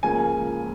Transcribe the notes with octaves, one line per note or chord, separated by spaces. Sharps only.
C#2 C#3 F3 A#3 G#5